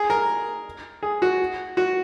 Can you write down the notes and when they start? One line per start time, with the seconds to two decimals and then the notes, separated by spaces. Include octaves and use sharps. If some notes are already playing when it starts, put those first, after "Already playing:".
Already playing: G#4
0.10 A#4
1.03 G#4
1.22 F#4
1.77 F#4